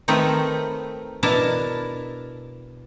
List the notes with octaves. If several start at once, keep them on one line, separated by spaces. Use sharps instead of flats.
D#3 A3 C4 D#4 A#4 B4
B2 D4 E4 A#4 A5